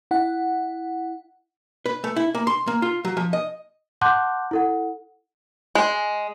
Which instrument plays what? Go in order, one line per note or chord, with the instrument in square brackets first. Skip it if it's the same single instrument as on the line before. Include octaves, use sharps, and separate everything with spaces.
[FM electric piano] E4 F#5
[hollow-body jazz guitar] B4
A3
E4
A#3
C6
A#3
F4
F#3
F3
D#5
[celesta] F#5 A5 C6 D6 F#6 G6
E4 A4 F#5
[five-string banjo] G#3